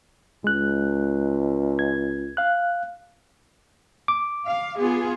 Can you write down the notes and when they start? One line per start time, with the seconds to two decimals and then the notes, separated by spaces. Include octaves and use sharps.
0.44 C#2 G#3 F#6
1.79 G#6
2.37 F5 F#6
4.08 D6
4.47 F5
4.79 B3 F4 G#4